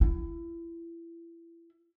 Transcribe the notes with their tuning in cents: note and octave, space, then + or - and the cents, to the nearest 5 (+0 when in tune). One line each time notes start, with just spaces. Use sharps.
E4 +30